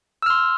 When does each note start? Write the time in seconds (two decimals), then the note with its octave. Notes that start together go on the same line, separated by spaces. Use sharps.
0.22 E6
0.26 F6
0.30 C6